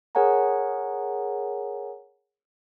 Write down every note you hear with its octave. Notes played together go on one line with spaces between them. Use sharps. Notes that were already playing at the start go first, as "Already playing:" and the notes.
G#4 A#4 C#5 F#5 G#5 A#5